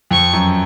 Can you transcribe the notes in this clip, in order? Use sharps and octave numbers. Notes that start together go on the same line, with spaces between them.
F2 C#6
F#2